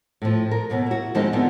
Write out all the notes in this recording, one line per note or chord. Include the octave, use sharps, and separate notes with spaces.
A2 F3
A#4
D#2 B2 A#3
E4 F#4
D#3 F3 G#3 A#3 C4 D#4
D3 F3 B3 C4